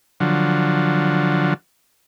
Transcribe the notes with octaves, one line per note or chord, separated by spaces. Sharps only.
D3 F3 F#3